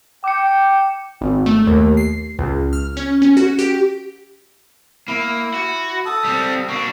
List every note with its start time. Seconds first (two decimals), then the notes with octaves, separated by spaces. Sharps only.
0.24 G5 D6 C#7
1.21 G#1
1.46 A3
1.67 D#2
1.97 C7
2.39 C#2
2.73 F6
2.97 C#4
3.22 C#4
3.37 F#4
3.59 G4
5.08 A#3 E4
5.54 F#4
6.06 A4 A5 D#6
6.25 G3 C4
6.69 A#3 D4 F#4